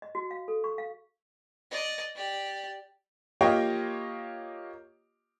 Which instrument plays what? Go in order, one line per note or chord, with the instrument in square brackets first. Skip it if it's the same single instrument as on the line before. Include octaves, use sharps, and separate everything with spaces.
[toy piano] D#5
F#4
F5
A4
C#6
F5
[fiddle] D5 D#5
G4 D5
[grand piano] A#3 F4 G4 C#5 D#5 G5